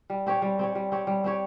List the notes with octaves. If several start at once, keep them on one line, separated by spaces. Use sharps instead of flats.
G3
C4 G4 C#5
G3
C4 G4 C#5
G3
C4 G4 C#5
G3
C4 G4 C#5